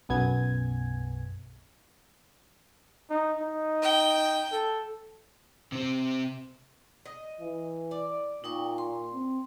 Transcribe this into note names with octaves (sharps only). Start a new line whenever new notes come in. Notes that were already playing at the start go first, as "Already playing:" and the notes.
B1 F#2 B3 G#5 G#6
D#4
D#4
G5
A4
C3 C4
D#5
E3
D5
A#2 D#4 G5 C#6
C6
C4